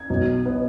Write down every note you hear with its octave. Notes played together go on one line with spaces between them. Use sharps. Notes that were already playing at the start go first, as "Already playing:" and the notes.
Already playing: G#6
B1
B2 B3